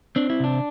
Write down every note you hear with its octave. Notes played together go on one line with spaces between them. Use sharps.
C4 D4
E4
C3 D4